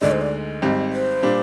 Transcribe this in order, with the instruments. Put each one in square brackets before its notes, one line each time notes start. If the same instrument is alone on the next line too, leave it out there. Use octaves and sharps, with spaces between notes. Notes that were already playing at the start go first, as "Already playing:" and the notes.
[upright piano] D2 D3 G#3 D#4 [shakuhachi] D5
[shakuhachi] C5
D5
[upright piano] G#1 G#2 G3 C4
[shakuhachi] C5
[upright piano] A#2 G3 D4